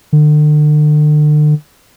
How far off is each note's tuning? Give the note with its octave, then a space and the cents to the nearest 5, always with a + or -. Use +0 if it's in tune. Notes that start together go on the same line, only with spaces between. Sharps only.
D3 +40